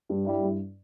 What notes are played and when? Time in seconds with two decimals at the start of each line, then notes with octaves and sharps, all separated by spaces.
0.09 G2
0.26 G3 E4
0.43 G2